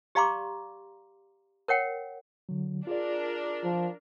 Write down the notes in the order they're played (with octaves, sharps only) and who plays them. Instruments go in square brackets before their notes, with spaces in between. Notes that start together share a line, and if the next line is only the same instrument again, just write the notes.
[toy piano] G4 D5 F5 A#5 C6 D6
A#4 C#5 F#5 G5
[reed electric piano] D3 F#3
[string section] D4 A#4 [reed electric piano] F4 G#4 D5
[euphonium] F3